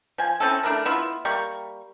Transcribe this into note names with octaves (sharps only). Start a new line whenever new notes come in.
F3 G#5
C4 C#4 E4 A4
A3 D4 E4 A#4
B3 E4 F4
G3 A#3 C#6